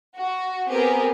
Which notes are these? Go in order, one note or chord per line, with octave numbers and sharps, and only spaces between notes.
F#4
B3 C4 G4 G#4 A#4